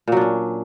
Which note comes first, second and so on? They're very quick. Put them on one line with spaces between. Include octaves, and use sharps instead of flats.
A#2 F#3 D4 C#4